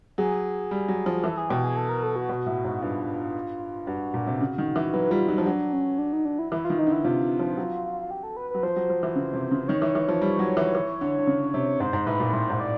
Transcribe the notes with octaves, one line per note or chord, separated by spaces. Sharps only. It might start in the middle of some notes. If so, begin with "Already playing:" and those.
F#3 G#4
G3
F#3
F3
E3 A4
G#4
B2 G4
G#4
A4
A#4
A4
F#4
B2
A2
G#2
G2 F4
G2 F#4
A#2
C3
C#3
D#3
E3
F#3 B4
G3 F4
F#3 D#4
F3
F#3 D4
C#4
D4
D#4
D4
E4
E3 E4
F4
D#3
D#4
D3
E4
C3 F4
F3
F#3
G4
A4
B4
F#3 B4
F3 C5
F#3
F3
E3
C#3
C3
C#3
D#3 C#5
E3
E3
F3
G3
F#3
E3
E3
D3
D3
C#3
C3
G#2 C5
G#2
A2 B4
A#2
A2 C5
G#2
D5